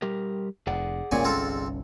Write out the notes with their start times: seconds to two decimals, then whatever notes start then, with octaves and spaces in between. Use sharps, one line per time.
0.02 G3 G4 A#4
0.67 F1 G#4 D5 F#5
1.11 G1 C2 A#2 C#3 C#4 G#5
1.24 C4 F4 A4